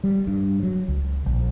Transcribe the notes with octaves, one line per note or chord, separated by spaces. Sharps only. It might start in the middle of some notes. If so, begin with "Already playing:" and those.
G3
G2
F#3
C#2
A#1